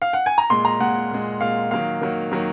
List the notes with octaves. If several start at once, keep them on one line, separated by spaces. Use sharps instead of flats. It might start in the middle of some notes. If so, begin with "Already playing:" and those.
F5
F#5
G#5
A#5
A#2 G#3 C6
A#5
A#2 G#3 F#5
A#2 G#3
A#2 G#3 F5
D#3 F#3 A#3 F5
D#3 F#3 A#3
D#3 F#3 A#3